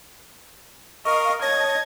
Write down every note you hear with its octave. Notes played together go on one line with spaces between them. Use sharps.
A#4 D#5 F5 C#6
C#5 D#5 A5 G#6 A#6